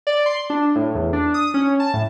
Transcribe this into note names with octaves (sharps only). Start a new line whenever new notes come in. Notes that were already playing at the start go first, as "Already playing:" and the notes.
D5
C6
D4
A2
E2
D4
D#6
C#4
A5
A2